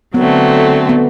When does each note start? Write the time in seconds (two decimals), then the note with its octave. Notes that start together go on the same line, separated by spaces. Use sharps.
0.14 D3 F#3 A3 B3 C4
0.89 B3